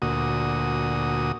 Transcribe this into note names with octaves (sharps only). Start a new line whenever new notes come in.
D2 A#2 F#4 D#6